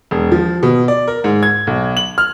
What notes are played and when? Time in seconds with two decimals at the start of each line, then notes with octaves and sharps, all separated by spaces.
0.11 E1
0.32 F3
0.63 B2
0.88 D5
1.08 A#4
1.24 G#2
1.43 G#6
1.67 B1
1.97 F#7
2.18 F6